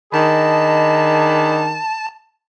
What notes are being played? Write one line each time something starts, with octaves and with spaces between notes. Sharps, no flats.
D#3 D4 G#4 D#5 A5 B5